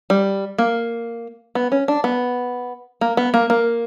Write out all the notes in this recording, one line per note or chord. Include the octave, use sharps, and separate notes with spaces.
G3
A#3
B3
C#4
D4
B3
A#3
B3
A#3
A#3